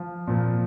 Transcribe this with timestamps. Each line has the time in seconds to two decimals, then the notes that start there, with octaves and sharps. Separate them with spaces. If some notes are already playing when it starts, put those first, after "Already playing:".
Already playing: F3
0.27 A#2 F3